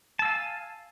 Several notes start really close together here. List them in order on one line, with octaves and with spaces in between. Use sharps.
A5 E6 F5 G#5